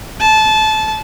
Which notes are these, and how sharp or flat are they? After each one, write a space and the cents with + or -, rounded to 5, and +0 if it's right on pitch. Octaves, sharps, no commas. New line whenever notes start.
A5 -20